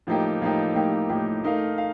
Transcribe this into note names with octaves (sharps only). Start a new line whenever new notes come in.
A2 F3 A#3 D#4 G4
A2 F3 A#3 D#4 G4
A2 F3 A#3 D#4 G4
A2 F3 A#3 D#4 G4
A3 D#4 A#4 F5
F5